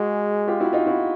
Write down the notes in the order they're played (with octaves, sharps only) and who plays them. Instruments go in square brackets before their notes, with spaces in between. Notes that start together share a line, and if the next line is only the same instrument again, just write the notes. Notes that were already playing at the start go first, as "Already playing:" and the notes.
Already playing: [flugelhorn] G#3 [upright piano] F#4 G#4
[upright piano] F4 G4
E4 F#4
D#4 F4
E4 F#4